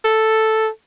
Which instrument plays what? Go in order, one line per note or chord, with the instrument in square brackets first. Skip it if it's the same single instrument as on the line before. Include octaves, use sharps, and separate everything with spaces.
[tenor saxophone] A4